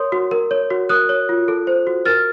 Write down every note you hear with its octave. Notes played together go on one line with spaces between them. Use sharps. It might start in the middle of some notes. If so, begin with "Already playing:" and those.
Already playing: A#4 C#5 C6 D#6
F#4
A#4
C#5
F#4
A#4 D#6 F#6
C#5
F4
A4
C5
F#4
A#4 F6 A6